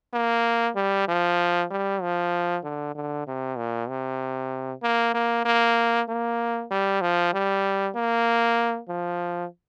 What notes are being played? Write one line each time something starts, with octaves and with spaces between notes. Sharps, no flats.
A#3
G3
F3
G3
F3
D3
D3
C3
A#2
C3
A#3
A#3
A#3
A#3
G3
F3
G3
A#3
F3